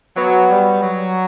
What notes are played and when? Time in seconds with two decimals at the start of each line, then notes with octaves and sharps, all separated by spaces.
0.17 F#3 B3
0.50 G3
0.82 F#3